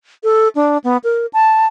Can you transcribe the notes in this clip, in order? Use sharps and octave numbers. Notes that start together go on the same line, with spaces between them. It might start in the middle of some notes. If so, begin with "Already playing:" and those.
A4
D4
B3
A#4
A5